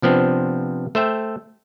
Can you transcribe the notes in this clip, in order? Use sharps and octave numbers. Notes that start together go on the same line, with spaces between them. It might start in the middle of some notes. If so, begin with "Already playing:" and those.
C3 F3 B3 C4 D4
A3 C5 E5 G5